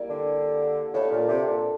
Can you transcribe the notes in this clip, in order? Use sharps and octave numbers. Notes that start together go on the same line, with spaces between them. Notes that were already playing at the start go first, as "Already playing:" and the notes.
Already playing: G3 A#3 E4 A#4
D3
A2 D4 A4 D5 F5
A#2
C3
A#2